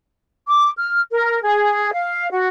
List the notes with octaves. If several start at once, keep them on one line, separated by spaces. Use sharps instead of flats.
D6
F6
A#4
G#4
F5
F#4